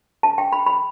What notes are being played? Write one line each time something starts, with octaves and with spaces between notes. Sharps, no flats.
A5
G5
B5
B5